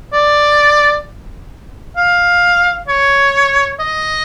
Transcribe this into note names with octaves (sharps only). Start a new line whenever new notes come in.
D5
F5
C#5
D#5